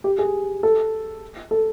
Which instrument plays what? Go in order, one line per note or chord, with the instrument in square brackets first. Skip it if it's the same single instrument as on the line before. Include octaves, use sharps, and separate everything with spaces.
[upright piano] G4
G#4
A4
A4